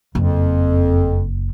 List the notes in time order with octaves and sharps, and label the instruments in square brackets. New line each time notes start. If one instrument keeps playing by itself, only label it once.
[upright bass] F#1 [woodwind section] F2